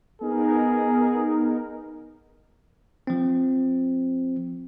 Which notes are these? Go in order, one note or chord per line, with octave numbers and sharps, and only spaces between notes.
B3 D#4 G#4 A#4
F3 C4